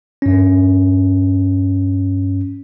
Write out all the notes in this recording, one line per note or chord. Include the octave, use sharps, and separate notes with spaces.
G2 C#4